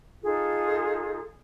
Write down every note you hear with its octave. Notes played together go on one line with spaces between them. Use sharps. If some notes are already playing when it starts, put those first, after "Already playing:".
D#4 F4 G#4 A4